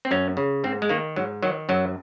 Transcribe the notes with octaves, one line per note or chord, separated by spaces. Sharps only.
C4
F#2 C#4
C#3
G#2 C4
G#3
D#3 A#3
G#2 F#3
D#3 F#3
F#2 F#3